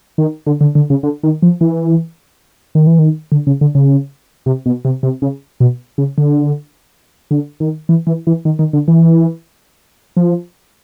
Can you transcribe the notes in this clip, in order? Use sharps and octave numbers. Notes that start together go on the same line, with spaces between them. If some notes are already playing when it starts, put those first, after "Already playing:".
D#3
D3
D3
D3
C#3
D3
D#3
F3
E3
D#3
E3
D#3
D3
C#3
D3
C#3
C3
B2
C3
C3
C#3
B2
C#3
D3
D3
D#3
E3
E3
E3
D#3
D#3
D3
E3
F3